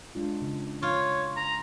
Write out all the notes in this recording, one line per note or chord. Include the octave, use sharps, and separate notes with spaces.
G#3 D4 F4
C#3
F4 C#5
A#5